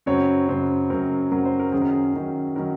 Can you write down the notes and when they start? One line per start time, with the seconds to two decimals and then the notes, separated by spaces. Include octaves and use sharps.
0.06 F#2 C#3 F#3 C4 C#5
0.48 F#2 C#3 F#3 C4 C5
0.90 F#2 C#3 F#3 C4 A#4
1.31 F#2 C#3 F#3 C4 A#4
1.45 C5
1.59 A#4
1.72 F#2 D#3 F#3 C#4 G#4
1.81 A#4
1.89 G#4
2.14 F#2 D#3 F#3 C#4
2.56 D#3 F#3 C#4 A#4